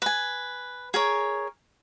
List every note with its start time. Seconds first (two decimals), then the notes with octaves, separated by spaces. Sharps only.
0.02 B4 G#5
0.94 G#4 A#4 C#5